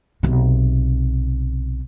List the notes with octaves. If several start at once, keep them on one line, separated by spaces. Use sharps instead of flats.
B1 C3